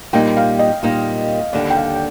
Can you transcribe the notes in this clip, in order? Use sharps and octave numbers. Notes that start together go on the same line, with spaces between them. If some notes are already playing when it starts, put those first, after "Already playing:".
A#2 G3 A#3 D#4 G5
F5
D#5
A#2 G3 A#3 D#4
D#2 D3 G3 D5
G5
F5